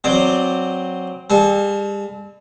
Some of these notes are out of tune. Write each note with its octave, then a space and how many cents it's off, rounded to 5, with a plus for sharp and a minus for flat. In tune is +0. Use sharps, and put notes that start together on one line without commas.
F#3 -15 C4 +0 D5 +0
G3 +40 A4 -35